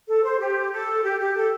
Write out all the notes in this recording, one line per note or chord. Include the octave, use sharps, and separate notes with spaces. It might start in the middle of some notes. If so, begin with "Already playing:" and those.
A4
C5
G4
A4
G4
G4
A4